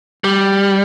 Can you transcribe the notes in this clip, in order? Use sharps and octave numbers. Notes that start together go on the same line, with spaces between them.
G3